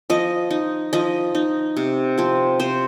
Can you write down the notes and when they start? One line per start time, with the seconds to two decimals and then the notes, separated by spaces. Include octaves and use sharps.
0.10 F3 D#5
0.51 D#4
0.93 F3 D#5
1.35 D#4
1.77 C3
2.18 F3 C4
2.60 C3 C5